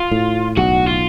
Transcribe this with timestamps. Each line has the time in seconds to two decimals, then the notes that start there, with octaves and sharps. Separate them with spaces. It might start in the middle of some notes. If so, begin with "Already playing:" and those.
Already playing: F4
0.12 A2
0.57 B1 F#4
0.87 F4